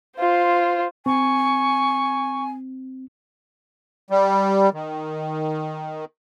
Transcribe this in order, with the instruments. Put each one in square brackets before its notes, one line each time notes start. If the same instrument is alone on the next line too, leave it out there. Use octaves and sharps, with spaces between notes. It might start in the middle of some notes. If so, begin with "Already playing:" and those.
[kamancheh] F4 C5
[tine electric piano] C4 [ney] G#5 [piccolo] C#6
[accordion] G3
D#3